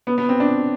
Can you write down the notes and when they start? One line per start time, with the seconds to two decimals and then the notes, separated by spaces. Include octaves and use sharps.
0.07 B3
0.18 B3
0.29 C4
0.40 D4